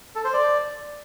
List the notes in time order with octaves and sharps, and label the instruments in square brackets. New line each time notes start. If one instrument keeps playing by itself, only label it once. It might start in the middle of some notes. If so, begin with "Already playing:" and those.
[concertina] A4
C5
D5